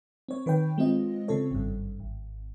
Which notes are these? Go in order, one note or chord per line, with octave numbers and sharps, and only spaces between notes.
C4 C#5
D#3 B4 C#5 G5
G#3 C4 F4 D#5
C#3 C4 A4 C#5
G#1 G2
G#1